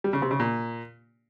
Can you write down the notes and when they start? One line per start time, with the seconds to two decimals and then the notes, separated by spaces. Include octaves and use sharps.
0.04 G3
0.13 C#3
0.22 C3
0.31 C#3
0.40 A#2